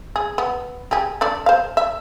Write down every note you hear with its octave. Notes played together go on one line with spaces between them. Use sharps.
G#4
B3
G4 G#4
A3 D4 D5
C5 F5
E5